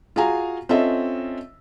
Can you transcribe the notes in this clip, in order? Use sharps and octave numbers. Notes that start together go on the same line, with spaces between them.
F4 F#4 G#4 F5 G#5 A#5
C4 C#4 F4 A4 D#5 E5